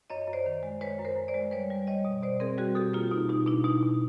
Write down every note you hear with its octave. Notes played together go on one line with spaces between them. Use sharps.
F#2 C#5 D#5
F#2
C5 D5
D#3
G#3
G#3 B4 C#5
F#2
A#4 C5
F#2
C5 D5
G#3
G3 B4 C#5
G3
G3 C#5 D#5
B2
B2 C5 D5
C4 G#4 A#4
G3 F#4 G#4
B2 G4 A4
A#3 F4 G4
B2 D#4
B2 D#4
B2 D4 E4
B2 D#4
B2